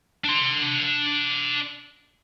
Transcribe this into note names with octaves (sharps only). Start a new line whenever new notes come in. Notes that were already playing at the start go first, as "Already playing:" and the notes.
D4 C6